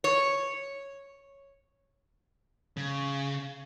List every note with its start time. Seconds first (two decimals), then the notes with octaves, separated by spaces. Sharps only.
0.04 C#5
2.77 C#3